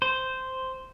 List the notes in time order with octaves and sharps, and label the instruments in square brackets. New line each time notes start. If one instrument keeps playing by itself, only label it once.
[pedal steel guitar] C5